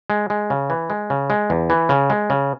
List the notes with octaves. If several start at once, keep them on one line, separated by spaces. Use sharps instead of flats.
G#3
G#3
C#3
E3
G#3
C#3
G#3
E2
E3
C#3
G#3
C#3